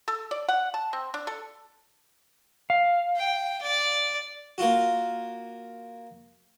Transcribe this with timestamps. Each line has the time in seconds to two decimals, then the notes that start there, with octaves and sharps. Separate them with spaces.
0.08 A4
0.31 D5
0.49 F#5
0.74 A5
0.93 C4
1.14 D4
1.27 A4
2.70 F5
3.16 G5
3.62 D5
4.58 A#3 F4 F#4